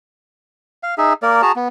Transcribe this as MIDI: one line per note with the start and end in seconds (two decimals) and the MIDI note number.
0.83 0.95 77
0.98 1.13 63
0.98 1.13 68
0.98 1.13 76
1.22 1.42 58
1.22 1.42 70
1.22 1.42 74
1.42 1.52 66
1.42 1.52 68
1.42 1.52 81
1.42 1.52 82
1.56 1.68 59